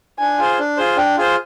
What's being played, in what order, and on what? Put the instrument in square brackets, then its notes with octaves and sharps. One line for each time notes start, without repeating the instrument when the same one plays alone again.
[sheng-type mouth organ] D4 [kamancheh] G#5
[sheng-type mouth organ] F4 G#4 C5
D4
F4 G#4 C5
[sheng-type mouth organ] D4 [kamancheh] G5
[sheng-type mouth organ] F4 G#4 C5